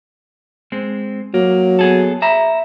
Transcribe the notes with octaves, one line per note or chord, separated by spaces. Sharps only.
G#3 C4
F#3 A#3
B3 G#4 A4
E5 A#5 B5